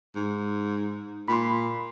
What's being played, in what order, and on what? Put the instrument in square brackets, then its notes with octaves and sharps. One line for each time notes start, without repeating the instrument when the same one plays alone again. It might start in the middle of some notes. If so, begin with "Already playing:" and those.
[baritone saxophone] G#2
[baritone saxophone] A#2 [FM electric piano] B5 C6